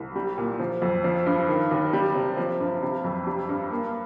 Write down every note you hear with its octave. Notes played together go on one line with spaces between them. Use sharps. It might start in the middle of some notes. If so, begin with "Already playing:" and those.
Already playing: C2
G3
A#2
F3
F2
F3
G2
D#3
D#2
G3
C3
F3
G2
C3
F2
G3
G2
A#3